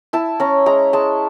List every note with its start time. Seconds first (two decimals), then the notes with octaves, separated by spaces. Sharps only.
0.13 E4 A5
0.40 C#4 A#5
0.66 G#3 A#5
0.93 G#3 A5